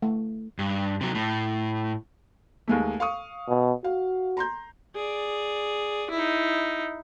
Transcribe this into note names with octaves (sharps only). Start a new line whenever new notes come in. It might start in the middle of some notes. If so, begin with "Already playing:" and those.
A3
G2
C3 F#3
A2
D#2 G#3 A3
F5 C#6 D#6
B2
F#4 F5
A#5 C6 G6
G#4 D5
D#4 E4